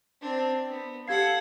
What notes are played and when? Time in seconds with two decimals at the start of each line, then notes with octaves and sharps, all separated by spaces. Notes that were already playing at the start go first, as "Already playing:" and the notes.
0.21 C4 D4
0.70 B3
1.08 G4 A4 F5 F#5 G#6 C7